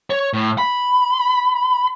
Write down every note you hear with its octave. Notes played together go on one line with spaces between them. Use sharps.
C#5
A2
B5